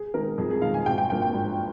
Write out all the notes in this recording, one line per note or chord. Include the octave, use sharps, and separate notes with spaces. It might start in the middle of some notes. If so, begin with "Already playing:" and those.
Already playing: G#4
D#3 G#3 A#4
F2 G#4
G#4
D#3 G#3 F5
G#5
G#1 G5
G5
G2 F3 A#3 G5
G5
G#1